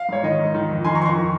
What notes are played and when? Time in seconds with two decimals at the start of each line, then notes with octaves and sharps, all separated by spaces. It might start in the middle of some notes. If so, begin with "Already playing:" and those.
Already playing: F5
0.09 G#2 C#5
0.23 D#3 D#5
0.39 G#2
0.54 D#3
0.70 F2
0.84 D#3 G#5 C6
0.95 A#5 C#6
1.00 F2 C6
1.05 A#5 C#6
1.15 D#3